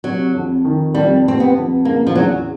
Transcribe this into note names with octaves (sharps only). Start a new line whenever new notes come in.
C3 F#3
F2
D#3
F2 G3
C3 C4
B3
F2
C#3 A#3
F3
E2 F#3